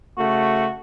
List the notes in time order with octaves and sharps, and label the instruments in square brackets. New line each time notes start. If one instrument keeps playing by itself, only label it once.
[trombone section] C#3 A3 [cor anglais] F#4